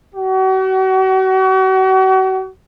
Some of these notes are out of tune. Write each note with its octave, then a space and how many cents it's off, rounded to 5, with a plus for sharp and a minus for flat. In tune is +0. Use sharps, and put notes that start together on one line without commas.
F#4 +40